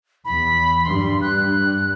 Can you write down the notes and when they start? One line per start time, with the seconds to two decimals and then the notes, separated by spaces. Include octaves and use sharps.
0.25 E2 B5
0.84 G2 G3 C6
1.21 F#6